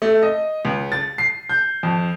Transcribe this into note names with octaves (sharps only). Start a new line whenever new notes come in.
A3
D#5
C#2
A6
C7
G6
F2